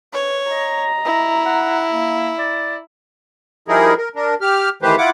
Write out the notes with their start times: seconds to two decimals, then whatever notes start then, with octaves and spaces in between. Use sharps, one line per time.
0.14 B4 C#5
0.51 D#5 A#5
1.05 E4
1.45 F#5
1.92 A#3
2.39 D5
3.68 F3 G3 D#4 E4 G#4 A#4
3.98 A#4
4.16 D4 A#4
4.41 G4 F6
4.82 D#3 E3 A3 G4 B4 C5
4.98 E4 F4 F#5 D6